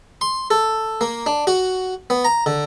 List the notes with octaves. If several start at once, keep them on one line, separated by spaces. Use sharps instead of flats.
C6
A4
A#3
D4
F#4
B3
A#5
D3